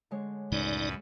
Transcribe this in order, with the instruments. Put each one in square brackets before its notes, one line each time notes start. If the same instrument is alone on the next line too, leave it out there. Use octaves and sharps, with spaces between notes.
[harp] D3 G#3 C#5
[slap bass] C#2 A2 C#3 [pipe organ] F#2 B4 [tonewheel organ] D#4 D5